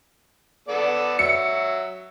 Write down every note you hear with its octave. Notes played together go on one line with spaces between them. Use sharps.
B3 A4 D5
F#3 E5 C#7